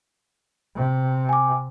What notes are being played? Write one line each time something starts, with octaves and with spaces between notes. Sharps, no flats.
C3
G#5 D6